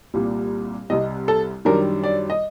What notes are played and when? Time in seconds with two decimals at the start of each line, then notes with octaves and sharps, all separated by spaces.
0.14 C2 A#2 G3
0.90 C2 C3 G3 D#5
1.28 A4
1.65 F#2 D#3 G3 D4 A#4
2.04 D5
2.30 D#5